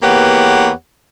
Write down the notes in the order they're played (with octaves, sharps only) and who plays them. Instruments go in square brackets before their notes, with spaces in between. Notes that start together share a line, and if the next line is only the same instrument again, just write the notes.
[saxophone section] E2 A#3 B3 G4 C#5 F#5